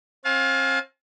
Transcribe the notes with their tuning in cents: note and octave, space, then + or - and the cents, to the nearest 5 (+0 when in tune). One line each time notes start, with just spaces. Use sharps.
C4 +40 F5 +20 A5 -40